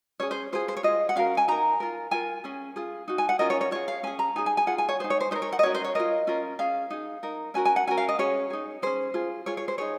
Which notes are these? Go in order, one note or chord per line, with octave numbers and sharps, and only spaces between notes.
C#4 G#4 C#5
C5
F4 G#4 C5
C5
C#5
F4 G#4 D#5
F#5
C#4 F#4 A#4 F5
G#5
D#4 A#4 A#5
F4 A#4
F4 A#4 G#5
C#4 G#4
F4 G#4
D#4 F#4
G#5
F#5
C#4 F4 A#4 D#5
C#5
C#5
F4 G#4 C#5
F5
C#4 G#4 G#5
A#5
D#4 G#4 G#5
G#5
G#5
F4 G#4 F#5
G#5
C#5
G#4 C5
D#4
C#5
C5
D#4 A#4 C5
C#5
F#5
D#5
C#4 F#4 A#4 C#5
C5
C#5
F4 A#4 D#5
C#4 F4 A#4
C#4 G#4 F5
D#4 G#4
D#4 A#4
C#4 F#4 A#4 G#5
G#5
F#5
C#4 F#4 A#4 G#5
F5
D#5
C#4 G#4 C#5
D#4 G#4
C#4 G#4 C5
F4 G#4
F4 G#4 C#5
C#5
C5
D#4 G#4 C#5